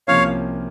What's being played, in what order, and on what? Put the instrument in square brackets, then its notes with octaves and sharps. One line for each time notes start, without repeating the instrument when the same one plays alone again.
[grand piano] C2 C3 F3 A#3 C#4 [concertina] C#5 F5